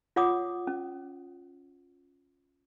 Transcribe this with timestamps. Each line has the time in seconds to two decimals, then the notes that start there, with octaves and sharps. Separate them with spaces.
0.16 F4 C#5 F#5 D6 D#6
0.67 C#4